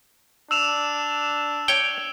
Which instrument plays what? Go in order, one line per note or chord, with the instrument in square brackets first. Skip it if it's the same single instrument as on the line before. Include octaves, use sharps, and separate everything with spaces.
[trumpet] D4 [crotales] E6 E7 F7
[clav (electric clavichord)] C#5 G5